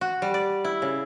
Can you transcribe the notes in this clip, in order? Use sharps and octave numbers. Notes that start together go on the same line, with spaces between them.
F#4
G3
D5
E4
C#3